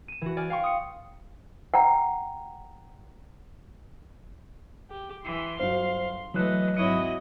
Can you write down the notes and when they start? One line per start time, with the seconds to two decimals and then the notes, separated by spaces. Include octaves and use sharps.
0.08 D#7 E7
0.21 E3 F#4
0.37 D5 G#5 F6
0.50 F5 G5 C6 C#6
0.64 D#6 C#7
1.74 F#5 G5 A#5
4.90 G4
5.24 E3 C6
5.60 G1 F#3 C5 F5
6.34 E3 F#3 A3 B4 D#5 F#6
6.77 G#1 E4 F#4 C#5 D#5 C#7